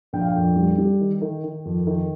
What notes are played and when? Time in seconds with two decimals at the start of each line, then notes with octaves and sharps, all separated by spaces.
0.13 A#1 G5
0.21 F5
0.28 G5
0.36 F2
0.56 G3
0.78 G3
1.00 D#3
1.21 D#3
1.44 D#3
1.65 F2
1.87 D#3